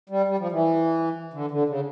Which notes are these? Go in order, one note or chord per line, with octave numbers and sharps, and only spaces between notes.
G3
G3
F3
E3
D3
D3
C#3